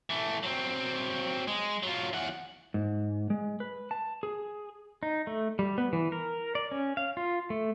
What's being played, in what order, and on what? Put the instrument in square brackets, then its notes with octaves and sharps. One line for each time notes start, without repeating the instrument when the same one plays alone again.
[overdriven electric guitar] E3 A3
F#3 C4
G#3
F#3 F4
E3 F#5
[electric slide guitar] G#2
G#3
B4
A5
G#4
[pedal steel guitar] D#4
A3
G3
B3
E3
A#4
D5
C#4
F5
F4
A3